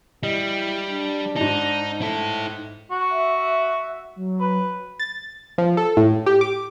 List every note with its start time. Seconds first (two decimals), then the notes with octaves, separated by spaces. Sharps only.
0.23 G3 E4 D#5
0.89 D4
1.36 G#2 D#4 A5
2.02 E4 A4
2.91 F#4
3.10 E5
4.16 F#3
4.40 B4
5.00 A6
5.58 F3
5.77 A4
5.97 A2
6.26 G4
6.41 D6